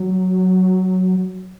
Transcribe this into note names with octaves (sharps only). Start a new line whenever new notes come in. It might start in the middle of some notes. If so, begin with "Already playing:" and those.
Already playing: F#3